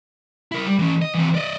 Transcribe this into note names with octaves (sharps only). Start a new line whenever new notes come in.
E4 A#4
G3
E3 C#4
D#5
E3 C4
D5 D#5